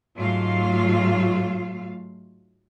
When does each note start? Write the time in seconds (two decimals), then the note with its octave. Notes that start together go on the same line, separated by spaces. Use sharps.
0.15 G#2 F#3 A3 F4 F5